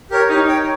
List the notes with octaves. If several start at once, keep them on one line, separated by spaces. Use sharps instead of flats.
G4 A#4 C#5
D#4 G4
C#5 G5